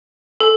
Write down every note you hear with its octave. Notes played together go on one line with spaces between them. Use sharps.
A4